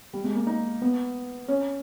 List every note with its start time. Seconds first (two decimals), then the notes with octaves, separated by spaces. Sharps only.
0.13 G3
0.24 G#3
0.35 A#3
0.47 D#4
0.82 B3
1.48 C#4